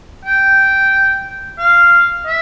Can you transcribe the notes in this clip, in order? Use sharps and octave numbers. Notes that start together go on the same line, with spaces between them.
G5
F5
E5